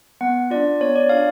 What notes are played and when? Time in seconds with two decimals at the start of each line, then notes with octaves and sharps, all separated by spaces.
0.21 B3 F#5
0.51 D4 F4 D5
0.80 B3 C#5
0.96 D5
1.09 D4 F4 F5